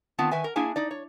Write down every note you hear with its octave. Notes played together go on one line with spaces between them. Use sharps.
D#3 B3 C4 F4 A5
D#3 B4 E5 G#5
A#4
A#3 D4 E4 G#4 G#5
D#4 D5
C#5